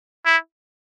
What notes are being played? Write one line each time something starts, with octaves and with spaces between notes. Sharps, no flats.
E4